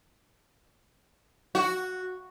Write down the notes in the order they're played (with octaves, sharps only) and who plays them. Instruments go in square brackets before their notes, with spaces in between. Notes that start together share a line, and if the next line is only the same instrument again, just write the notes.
[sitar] F#4